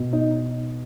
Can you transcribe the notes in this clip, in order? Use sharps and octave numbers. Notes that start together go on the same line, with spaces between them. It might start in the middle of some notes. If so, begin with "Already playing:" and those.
Already playing: B2
D#4